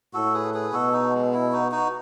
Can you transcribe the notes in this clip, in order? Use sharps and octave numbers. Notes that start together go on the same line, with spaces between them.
A2 F#4 A4
G#4 B4
G#4 B4
B2 F#4 A4
D#4 F#4
G#3
E4
D#4 F#4
D#4 F#4